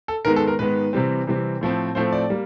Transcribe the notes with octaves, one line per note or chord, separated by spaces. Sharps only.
A4
G#2 D#3 G#3 B3 A#4
A4
A#4
G#2 D#3 G#3 B3 B4
C3 E3 G3 C4
C3 E3 G3 C4
A2 F3 A3 C4
A2 F3 A3 C4 C5
D5
G3 A#3